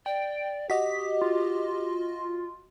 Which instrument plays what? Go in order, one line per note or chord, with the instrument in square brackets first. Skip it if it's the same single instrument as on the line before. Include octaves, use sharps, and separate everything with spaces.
[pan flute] D5 [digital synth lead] G5
[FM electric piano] F#4 D#5 [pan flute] G4 [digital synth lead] B6
[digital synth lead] F4